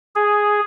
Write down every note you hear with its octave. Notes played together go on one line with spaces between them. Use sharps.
G#4